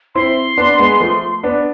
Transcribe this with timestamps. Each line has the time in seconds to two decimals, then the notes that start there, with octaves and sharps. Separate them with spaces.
0.15 C4 E4 C6
0.58 B3 D4
0.79 G#3 B3
1.01 F3 A3
1.43 B3 D4